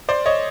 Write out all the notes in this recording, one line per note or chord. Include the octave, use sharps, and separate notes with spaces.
C5 D5
C#5 D#5